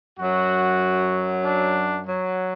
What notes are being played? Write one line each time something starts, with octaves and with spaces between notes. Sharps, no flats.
F#2 F#3 F#4
D4
F#3